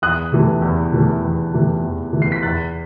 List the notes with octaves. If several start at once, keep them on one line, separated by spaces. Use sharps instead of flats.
E2 D#6 F#6
C3 E3 A3
E2
C3 E3 A3
E2
C3 E3 A3
E2
C3 E3 A3
C7
B6
E2 F#6 A6